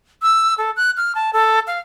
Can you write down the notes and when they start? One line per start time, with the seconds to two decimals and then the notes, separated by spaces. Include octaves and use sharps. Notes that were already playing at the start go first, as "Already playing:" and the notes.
0.22 E6
0.58 A4
0.76 F#6
0.97 F6
1.15 A5
1.33 A4
1.67 F5